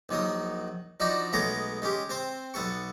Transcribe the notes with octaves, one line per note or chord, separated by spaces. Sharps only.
A#1 D#3 F#3 D#6
F3 D4 D#4 F#4
B1 G#3 A3 B3 C#5 A#5
G#3 C#4 G4
C4 C5
B1 B3 A4 C#6